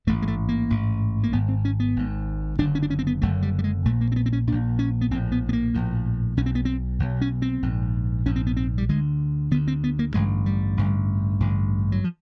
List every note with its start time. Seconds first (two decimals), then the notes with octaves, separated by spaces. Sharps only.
0.07 A1 G#2 A3
0.22 G#3
0.28 A3
0.49 A#3
0.70 A1 G#2
1.23 A#3
1.33 G#1 G#2 B3
1.49 C4
1.65 C#4
1.80 B3
1.96 G#1 G#2
2.58 F#1 F#2 D3 D4
2.75 C#4
2.82 D4
2.90 C#4
2.99 C4
3.07 B3
3.22 F#1 F#2 D3 A3
3.42 G3
3.59 G3
3.64 G#3
3.85 A#1 A#2 A3
4.01 A#3
4.12 C4
4.16 B3
4.26 C4
4.33 C#4
4.47 A#1 A#2 D4
4.79 C#4
5.01 B3
5.11 A#1 C4
5.14 A2
5.32 B3
5.49 B3
5.53 A#3
5.74 A#1 A2
6.37 B1 B2 C#4
6.46 C4
6.55 B3
6.65 C4
6.99 B1 B2
7.21 C#4
7.42 C4
7.62 A#1 G#2
8.26 A#1 G#2 C#4
8.36 C4
8.47 B3
8.57 C4
8.78 G3
8.89 D2 D3 G#3
9.51 D2 D3 B3
9.68 C4
9.84 B3
9.99 A#3
10.14 A1 G2 D3 G#3
10.46 G3
10.77 A1 G2 D3
11.40 A1 G2 D3
11.92 F#3
12.04 F3